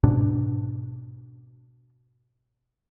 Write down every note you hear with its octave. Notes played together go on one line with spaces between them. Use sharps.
G#2 B2 D4